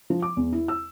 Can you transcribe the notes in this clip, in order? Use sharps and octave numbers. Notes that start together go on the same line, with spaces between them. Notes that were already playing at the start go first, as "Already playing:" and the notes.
F3
D6
E2
E4
E6